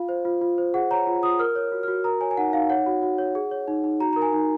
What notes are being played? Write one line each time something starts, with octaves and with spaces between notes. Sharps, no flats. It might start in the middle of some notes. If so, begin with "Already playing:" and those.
Already playing: F4 F5
C5
F4
F4
C5
G#4 F#5
C#5 A#5
F4
F4 D#6
A#4 F6
C#5
F#4
F#4 F6
A#4 A#5
C#5 G#5
G#5
D#4 F#5
D#4 F5
C#5 F#5
F#4
F#4
C#5
G#4
C#5
D#4
D#4
F#4 A#5
A#4 A#5
G#5
D#4